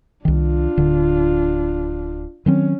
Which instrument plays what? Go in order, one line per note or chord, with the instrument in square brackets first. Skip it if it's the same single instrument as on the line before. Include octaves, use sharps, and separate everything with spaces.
[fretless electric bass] C2 D#3 [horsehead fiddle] D4 F4
[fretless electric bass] D1 D3
[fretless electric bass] D#3 F#3 C4 [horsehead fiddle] C#4